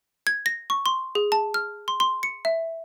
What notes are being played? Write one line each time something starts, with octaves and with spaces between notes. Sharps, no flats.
G#6
A#6
C#6
C6
G#4
A5
F6
C6
C6
C#7
E5